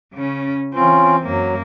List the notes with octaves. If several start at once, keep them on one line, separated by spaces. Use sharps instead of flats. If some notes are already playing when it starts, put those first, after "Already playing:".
C#3 C#4
E3 C4 C#4 F4
F#2 F#3 A#3